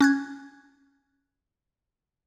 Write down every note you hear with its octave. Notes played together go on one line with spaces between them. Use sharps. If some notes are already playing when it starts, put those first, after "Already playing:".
C#4 F#6 G#6